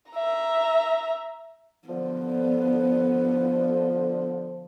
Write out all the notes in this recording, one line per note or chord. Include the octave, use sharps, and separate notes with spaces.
E5 A#5
D3 F3 B3